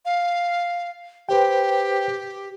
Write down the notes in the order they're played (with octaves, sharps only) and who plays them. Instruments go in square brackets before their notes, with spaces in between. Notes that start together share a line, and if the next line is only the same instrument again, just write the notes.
[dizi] F5
[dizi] G4 [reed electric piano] B4 C5 G5